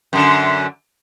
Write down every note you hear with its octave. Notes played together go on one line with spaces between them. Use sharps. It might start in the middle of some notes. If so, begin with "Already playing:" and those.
F#2 D3